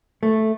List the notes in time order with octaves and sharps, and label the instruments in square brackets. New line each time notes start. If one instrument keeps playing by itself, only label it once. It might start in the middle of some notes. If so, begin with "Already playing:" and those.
[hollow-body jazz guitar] A3